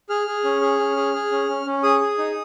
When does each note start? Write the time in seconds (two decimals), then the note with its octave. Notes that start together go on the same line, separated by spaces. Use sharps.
0.09 G#4 F6
0.27 G#4
0.44 C#4
0.61 G#4
0.79 C#4
0.96 G#4
1.14 G#4
1.31 C#4
1.49 C#4
1.66 C#4
1.83 G#4 D#6
2.01 G#4
2.18 D#4